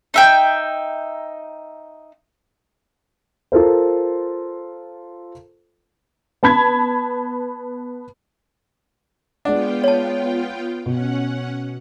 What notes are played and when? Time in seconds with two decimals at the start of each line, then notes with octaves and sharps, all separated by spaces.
0.14 D#4 E5 G5
3.52 F4 A4 A#4 C5
6.43 B3 A5 B5 G#6
9.45 G#3 B3 D4 F4 F#5 G5
9.84 C#5 A5
10.86 B2 C#4 F#5